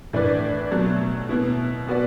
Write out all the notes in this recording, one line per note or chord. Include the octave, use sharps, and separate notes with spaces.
A2 E3 D4 B4 D5
B2 F#3 A3
B2 B3 E4
B2 B3 F#4 B4 D5